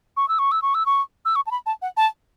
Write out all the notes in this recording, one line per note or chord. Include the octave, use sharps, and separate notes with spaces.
C#6
E6
C#6
E6
C#6
E6
C#6
E6
C#6
A5
B5
A5
F#5
A5